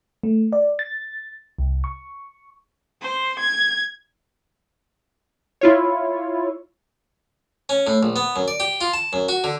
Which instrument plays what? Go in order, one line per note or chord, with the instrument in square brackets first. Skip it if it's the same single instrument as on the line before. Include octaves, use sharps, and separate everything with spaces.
[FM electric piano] A3
D5
A6
C2
C#6
[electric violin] C5
G#6
[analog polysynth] E4 F4 C#5
[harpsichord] C#4
A2
A#1
B3
F#2
D5
G4
F4
A5
F#2
F#4
D3